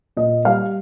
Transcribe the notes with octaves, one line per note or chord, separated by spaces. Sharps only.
A#2 D#5
G3 F5